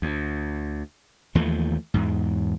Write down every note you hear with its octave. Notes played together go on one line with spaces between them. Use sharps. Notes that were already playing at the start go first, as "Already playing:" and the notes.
D2
D#2 E3 F3 A3
E2 G#2